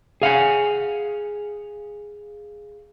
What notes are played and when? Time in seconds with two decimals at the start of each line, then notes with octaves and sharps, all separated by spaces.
0.22 G#4 F5 F#5 G#5